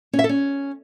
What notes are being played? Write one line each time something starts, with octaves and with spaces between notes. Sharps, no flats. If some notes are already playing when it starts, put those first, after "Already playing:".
C#4
E5
A4
C#4